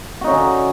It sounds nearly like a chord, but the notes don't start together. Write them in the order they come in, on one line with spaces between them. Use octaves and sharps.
F#4 D#4 C#4 D3